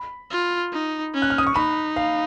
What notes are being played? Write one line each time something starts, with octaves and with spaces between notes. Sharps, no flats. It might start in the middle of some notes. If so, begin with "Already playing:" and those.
Already playing: B5
F4
D#4
C#4
F#6
F6
D#6
C#6
D#4 B5
F5